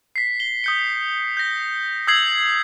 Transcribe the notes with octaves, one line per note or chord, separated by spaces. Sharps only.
B6 C7
G7
D#6 G6 C#7
G6 A#6
D#6 E6 G6 G#6 C7 F#7